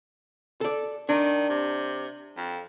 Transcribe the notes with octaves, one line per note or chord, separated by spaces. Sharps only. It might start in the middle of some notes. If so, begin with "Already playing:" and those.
A4 D5
D#3 D4
C3
F2